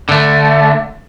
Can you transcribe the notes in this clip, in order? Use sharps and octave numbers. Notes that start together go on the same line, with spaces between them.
D3 A3